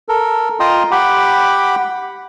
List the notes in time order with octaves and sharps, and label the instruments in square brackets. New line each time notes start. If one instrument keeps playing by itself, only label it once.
[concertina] A4 A#4
F4 D#5 G5 A#5 C6 D#6
G4 F#5 G5 B5 D6